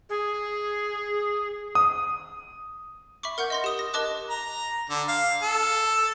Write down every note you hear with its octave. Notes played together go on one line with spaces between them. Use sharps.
G#4
D#6
E5 B5 C#6 D6
A#4 F#5 C#6 G6
D#5 C6 A#6
G4 D#6 G7
A#6
A#4 D#5 A5 D6 F#6
A#5
D3
F5
A4